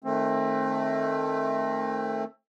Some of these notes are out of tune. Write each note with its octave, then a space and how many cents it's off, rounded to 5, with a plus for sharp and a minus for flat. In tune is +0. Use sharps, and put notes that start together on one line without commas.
D#3 +0 A3 +0 C4 +30